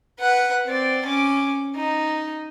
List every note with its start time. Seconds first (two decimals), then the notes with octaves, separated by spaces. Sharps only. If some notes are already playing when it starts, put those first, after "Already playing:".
0.19 B4 F#5
0.65 C4 D5
1.05 C#4 D6
1.76 D#4